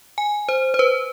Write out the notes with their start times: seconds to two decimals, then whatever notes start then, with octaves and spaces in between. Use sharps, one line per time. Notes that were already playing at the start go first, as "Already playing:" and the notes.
0.18 G#5
0.49 C5
0.74 C5
0.79 B4